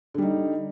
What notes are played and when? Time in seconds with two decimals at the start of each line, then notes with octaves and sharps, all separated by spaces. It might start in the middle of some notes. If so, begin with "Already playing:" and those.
0.14 D3
0.18 G3
0.22 D#4